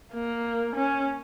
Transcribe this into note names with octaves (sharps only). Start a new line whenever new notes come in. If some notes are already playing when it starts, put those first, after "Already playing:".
A#3
C#4